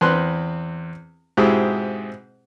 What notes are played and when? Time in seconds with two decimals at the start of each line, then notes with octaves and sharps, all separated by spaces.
0.01 E2 C4 B4 C6 F#6
1.37 G#2 B2 C4 E4 G4 G#4